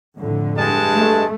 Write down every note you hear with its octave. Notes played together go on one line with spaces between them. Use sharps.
F2 A2 D3
G2 G#3 A5
A3